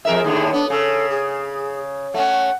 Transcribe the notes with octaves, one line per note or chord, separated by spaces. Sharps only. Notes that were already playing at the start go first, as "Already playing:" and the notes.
F2 G#4 A#4 E5
D#2 A2 D3
B3 D4
C#3 A4
G#4
A3 C#4 F#5